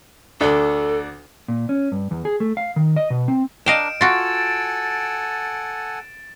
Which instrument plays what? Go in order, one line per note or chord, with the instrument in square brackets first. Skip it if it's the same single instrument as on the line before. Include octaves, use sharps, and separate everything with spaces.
[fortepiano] D2 D4 [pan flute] A4
[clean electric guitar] A#2
C#4
G2
E2
G#4
A3
F5
D#3
D#5
B2
C4
[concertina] D4 A#4 [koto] D#5 F5 G5 [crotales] D7 E7
[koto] F4 F#4 [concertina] A4 F#5 G#5 [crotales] A6 D7